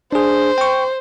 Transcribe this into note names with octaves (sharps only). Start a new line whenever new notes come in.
D4 G#4 C5
G5 C#6